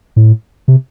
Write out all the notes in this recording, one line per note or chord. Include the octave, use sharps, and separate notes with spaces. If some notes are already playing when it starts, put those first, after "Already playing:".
A2
C3